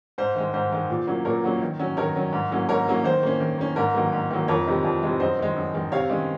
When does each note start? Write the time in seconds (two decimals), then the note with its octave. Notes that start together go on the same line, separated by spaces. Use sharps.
0.18 G#2 C5
0.35 D#3 G#3
0.54 G#2 C5
0.72 D#3 G#3
0.90 A#2
1.07 F#3 A#3 C#4
1.25 A#2 A#4 C#5
1.44 F#3 A#3 C#4
1.62 D#3
1.79 F#3 C#4
1.97 D#3 A#4 C#5
2.16 F#3 C#4
2.33 G#2
2.51 F#3 A#3 C#4
2.69 G#2 A#4 C#5
2.88 F#3 A#3 C#4
3.04 D#3 C5
3.23 A#3 C#4
3.40 D#3
3.58 A#3 C#4
3.76 G#2 A#4
3.94 D#3 F#3 A#3
4.12 G#2
4.31 D#3 F#3 A#3
4.48 F2 A#4 C#5
4.67 C3 D#3 G#3
4.85 F2
5.02 C3 D#3 G#3
5.20 F#2 C5 D#5
5.39 D#3 G#3
5.56 F#2
5.74 D#3 G#3
5.92 C3 C#5 F5
6.09 D#3 G#3 C#4